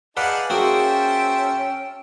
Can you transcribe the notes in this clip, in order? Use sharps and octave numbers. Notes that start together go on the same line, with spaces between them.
D#4 G#4 B4 D5 F5 F#5 A5
A#3 C#4 F#4 G#4 C5 E5 G5 A5